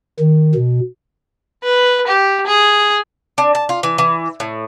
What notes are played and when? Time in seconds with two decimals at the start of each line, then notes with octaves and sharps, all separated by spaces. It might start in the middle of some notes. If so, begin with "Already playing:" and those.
0.20 D#3
0.55 B2
1.63 B4
2.07 G4
2.47 G#4
3.38 D4
3.55 A5
3.69 F4
3.83 E3
3.98 E3
4.40 A2